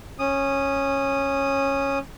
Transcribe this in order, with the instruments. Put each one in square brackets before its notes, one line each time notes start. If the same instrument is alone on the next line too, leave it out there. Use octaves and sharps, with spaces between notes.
[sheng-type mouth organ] C#4 D#6